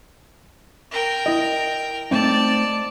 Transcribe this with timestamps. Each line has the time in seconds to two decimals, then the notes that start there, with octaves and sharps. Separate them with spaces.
0.91 A#4 G5
1.26 E4 D#5
2.11 A3 C4 D#4 D5 A5